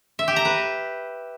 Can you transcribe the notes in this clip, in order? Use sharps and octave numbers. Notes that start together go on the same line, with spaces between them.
E5
G4
A#5
B4